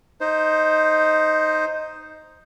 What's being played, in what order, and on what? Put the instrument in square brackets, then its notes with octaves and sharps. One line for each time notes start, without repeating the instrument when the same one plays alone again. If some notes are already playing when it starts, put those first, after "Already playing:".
[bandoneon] D#4 C5